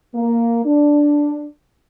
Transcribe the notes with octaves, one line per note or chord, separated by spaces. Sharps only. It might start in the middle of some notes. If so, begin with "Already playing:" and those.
A#3
D4